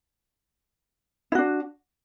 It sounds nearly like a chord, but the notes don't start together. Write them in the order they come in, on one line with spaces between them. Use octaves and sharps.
E4 F#4 D4